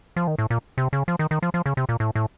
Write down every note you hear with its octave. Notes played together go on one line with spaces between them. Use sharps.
F3
D#3
A2
A#2
C3
C#3
F3
D#3
D#3
F3
F3
C#3
C3
A#2
A2
A2